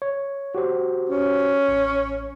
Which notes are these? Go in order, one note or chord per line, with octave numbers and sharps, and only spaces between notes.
C#5
F#4 G4 C5
C#4
A1